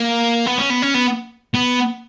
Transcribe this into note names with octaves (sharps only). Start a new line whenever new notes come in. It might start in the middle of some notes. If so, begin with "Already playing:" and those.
Already playing: A#3
B3
C#4
B3
C#4
B3
B3